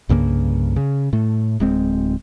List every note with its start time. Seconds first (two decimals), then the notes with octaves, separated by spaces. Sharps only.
0.09 C2 G2 C#3 A#3
0.76 C#3
1.13 A2 A3
1.60 D1 G#3 C4